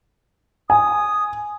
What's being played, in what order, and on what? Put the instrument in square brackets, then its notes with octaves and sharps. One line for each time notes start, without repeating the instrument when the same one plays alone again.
[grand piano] G#5 [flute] D#6